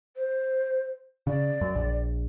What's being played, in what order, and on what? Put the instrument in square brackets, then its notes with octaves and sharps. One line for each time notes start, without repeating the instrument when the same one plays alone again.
[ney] C5
[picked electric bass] C#3 [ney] D5
[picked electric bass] F#2
A#1